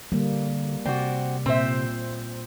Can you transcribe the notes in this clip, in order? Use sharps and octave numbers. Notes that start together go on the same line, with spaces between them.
D3 G3 A#3
C3 C4 F#4 D5
A#2 C4 C5 E5